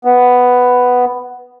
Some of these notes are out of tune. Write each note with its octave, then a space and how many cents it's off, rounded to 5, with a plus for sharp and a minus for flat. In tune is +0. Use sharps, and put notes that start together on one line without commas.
B3 +5